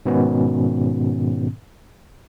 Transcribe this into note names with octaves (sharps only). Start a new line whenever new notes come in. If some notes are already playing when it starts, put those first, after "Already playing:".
G#2 B2 D#3 B3 C#4